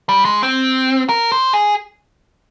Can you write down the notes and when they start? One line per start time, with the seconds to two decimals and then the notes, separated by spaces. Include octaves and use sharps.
0.09 G3
0.25 G#3
0.43 C4
1.09 A#4
1.32 C5
1.53 G#4